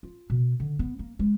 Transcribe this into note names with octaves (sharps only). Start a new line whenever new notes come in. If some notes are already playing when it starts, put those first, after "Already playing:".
F4
B2
D3
B3
A#3
G#3